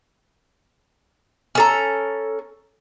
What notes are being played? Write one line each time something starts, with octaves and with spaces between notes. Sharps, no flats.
C#4 A4 A#5